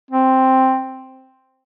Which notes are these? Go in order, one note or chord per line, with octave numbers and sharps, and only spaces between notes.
C4